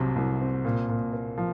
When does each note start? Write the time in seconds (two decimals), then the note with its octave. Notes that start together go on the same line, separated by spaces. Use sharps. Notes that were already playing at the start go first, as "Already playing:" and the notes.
Already playing: C2 C3 F#3 C4
0.16 C2
0.40 C4
0.65 A#2
0.89 A#2
1.13 A#3
1.38 F3